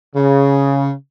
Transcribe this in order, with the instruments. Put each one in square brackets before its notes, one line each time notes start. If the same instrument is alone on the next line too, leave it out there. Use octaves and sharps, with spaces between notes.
[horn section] C#3